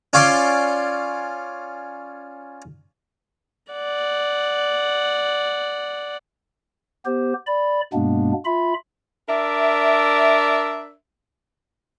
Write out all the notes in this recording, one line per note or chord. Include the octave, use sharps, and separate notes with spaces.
C#4 F4 D5 C6
D5 F#5
B3 G4 C5
D5 B5
G2 B2 G#3 A#3 B3 D4
F4 E5 B5
D4 A#4 D5 E5